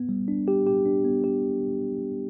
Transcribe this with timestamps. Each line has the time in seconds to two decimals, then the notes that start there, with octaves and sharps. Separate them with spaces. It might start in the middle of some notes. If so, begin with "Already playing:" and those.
Already playing: B3
0.09 G3
0.28 D4
0.48 G4
0.67 G4
0.86 D4
1.05 B3
1.24 G4